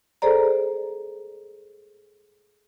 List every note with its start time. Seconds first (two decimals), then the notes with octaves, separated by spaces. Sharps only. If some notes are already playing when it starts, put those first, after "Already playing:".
0.22 G#4 A4 C5 D5 A#5